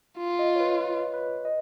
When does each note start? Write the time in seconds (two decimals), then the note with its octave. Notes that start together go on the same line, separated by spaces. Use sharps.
0.18 F4
0.39 D#5
0.56 C#5
0.60 B4
0.81 B4
1.14 B4
1.45 D#5